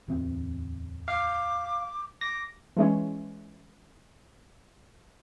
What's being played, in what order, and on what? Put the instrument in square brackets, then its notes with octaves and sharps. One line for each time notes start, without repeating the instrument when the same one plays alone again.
[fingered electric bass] D1 E2 C4
[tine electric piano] F5 [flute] D6
[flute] D6 [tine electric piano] A#6
[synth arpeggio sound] E3 G#3 C#4